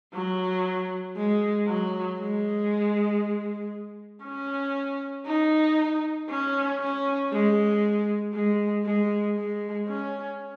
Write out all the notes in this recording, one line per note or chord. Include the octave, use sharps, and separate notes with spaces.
F#3
G#3
F#3
G#3
C#4
D#4
C#4
C#4
G#3
G#3
G#3
G#3
C#4